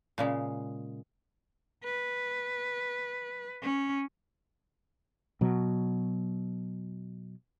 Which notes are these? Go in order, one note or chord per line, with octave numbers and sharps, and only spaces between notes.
A#2 C#3 G#3
B4
C#4
B2 F#3